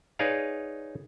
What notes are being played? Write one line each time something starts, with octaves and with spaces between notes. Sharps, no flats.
D#4 G#4 B4 C#5 D5 F5